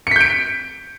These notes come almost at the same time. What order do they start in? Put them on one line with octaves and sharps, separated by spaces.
C#7 B6 G6 D7